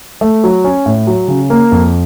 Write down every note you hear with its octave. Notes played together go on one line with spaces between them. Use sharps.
A3
F#3
C#4
A2
F#3
C#3
A#3
F2